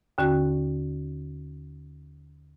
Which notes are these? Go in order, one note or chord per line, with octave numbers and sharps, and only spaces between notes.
D#2 D3 C#4 F#4 F#6